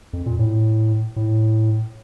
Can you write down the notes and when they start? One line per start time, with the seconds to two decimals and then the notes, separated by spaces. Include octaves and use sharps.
0.13 F2
0.26 A#2
0.39 A2
1.16 A2